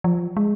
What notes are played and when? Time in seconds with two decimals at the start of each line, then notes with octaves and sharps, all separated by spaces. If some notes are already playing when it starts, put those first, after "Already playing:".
0.04 F3
0.37 G#3